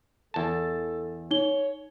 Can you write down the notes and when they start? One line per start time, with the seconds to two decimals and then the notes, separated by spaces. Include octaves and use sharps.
0.34 E2 A4 A5
1.31 D#4 C#5 G7